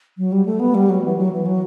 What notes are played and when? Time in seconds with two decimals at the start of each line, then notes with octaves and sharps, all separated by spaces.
0.18 F#3
0.32 G3
0.46 A3
0.60 B3
0.75 G3
0.90 F#3
1.04 E3
1.17 F#3
1.32 E3
1.46 F#3